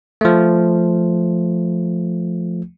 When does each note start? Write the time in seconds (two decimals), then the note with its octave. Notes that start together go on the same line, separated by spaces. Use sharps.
0.21 F3 A3